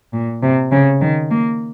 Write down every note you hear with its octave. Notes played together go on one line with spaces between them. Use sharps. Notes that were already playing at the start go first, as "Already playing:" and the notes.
A#2
C3
C#3
D#3
A#3